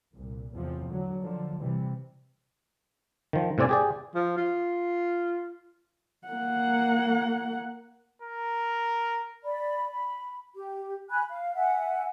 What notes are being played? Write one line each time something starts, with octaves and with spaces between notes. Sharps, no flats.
C2 A#2
E2 A2 C3 F3
D3 F#3
D3 F3
C3 E3 G3
D#3 F3
A2 C3 C4 D5 G#5
G4 G#4 D5
F3
F4
A#3 F#5
A#4
D5 B5
B5
G4
G#5 B5 F#6
F5
E5 F#5 G#5